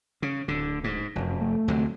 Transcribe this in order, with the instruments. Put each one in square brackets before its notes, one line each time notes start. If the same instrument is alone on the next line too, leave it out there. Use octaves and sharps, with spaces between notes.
[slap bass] C#3
[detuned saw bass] D1 [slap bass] D3
[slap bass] G#2
[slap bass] F1 [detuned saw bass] F#2
[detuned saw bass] A3
[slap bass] D2 C3 F#3